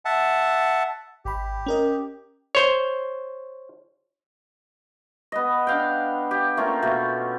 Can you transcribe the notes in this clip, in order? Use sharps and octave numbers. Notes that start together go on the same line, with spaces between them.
E5 F#5 A5
G#1 G4 B5
C#4 A#4 D#5
C5 C#5
B3 D#5
D4 F5 G5
G4
A3 A#3 C#4 F4
B2 A3